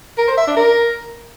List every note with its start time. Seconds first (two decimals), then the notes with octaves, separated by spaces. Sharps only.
0.18 A#4
0.28 C5
0.37 E5
0.47 D4
0.57 A#4